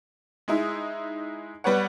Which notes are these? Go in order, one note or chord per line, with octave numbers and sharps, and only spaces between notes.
G#3 D#4 E4
G3 B3 B4 C#5 F#5